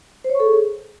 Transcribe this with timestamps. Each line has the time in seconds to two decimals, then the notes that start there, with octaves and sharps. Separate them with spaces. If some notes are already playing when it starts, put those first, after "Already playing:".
0.24 C5
0.30 C#5
0.35 C#6
0.40 A4
0.45 G#4